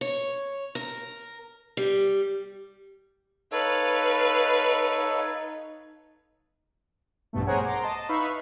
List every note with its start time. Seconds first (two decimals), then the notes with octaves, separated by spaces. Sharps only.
0.01 C#5
0.75 A#4
1.77 G3
3.52 D#4 A4 B4 C#5 F5
7.33 A#1 G2 B2 A3
7.46 G#4 A#4 C5 C#5 F#5 G#5
7.65 A#5 C6 D6
7.83 D#5 A5
8.09 D#4 B4 E5 F5 B5 C#6